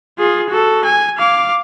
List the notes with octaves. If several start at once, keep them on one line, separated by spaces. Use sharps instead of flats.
F4 G#4
F#4 A4
G#5
F5 D6